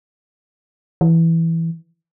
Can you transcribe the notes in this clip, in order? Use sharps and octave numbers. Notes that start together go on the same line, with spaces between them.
E3